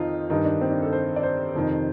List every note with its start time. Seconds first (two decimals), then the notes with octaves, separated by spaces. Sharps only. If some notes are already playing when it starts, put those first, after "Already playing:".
Already playing: F2 D#3 C4 D#4 F4
0.30 G2 D#3 D#4
0.45 D4
0.61 C4
0.71 D4
0.82 A4
0.93 C5
1.16 D5
1.23 C5
1.55 F2 C3 D#3